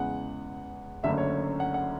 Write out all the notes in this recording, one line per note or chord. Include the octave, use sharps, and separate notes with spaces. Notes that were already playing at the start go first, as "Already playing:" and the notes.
Already playing: E2 C#3 G#3 F#5
F#1 F#2 D3 A3 E5
C#5
F#5
F#5